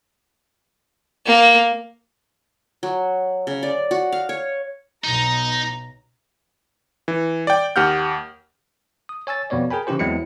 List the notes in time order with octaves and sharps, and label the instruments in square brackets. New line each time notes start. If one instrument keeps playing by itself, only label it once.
[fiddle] A#3
[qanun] F#3
C#3
D5
F#4
F5
C#5
[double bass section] B1 [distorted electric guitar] D#4 [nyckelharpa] A#5
[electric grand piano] E3
D5 G5
D#2 G4 F#5 F6 G6
[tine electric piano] D#6
C#5 G#5 E6 A6
F2 B2 B3 C#5 D5
G#4 A#4 G5 G#5 B5
C#3 E3 C#4 E4 G4 C5
E2 F#3 G#3 C4 E4 C#7